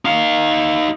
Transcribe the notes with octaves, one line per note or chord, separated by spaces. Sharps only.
D#4 F5